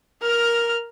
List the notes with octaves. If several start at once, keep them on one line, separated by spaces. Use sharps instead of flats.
A#4 F6